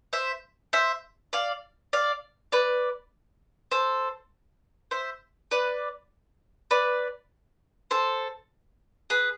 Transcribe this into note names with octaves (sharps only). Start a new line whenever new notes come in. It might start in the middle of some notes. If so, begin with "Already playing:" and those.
C5 E5
C5 E5
D5 F5
D5 F5
B4 D5
A4 C5
C5 E5
B4 D5
B4 D5
A4 C5
G#4 B4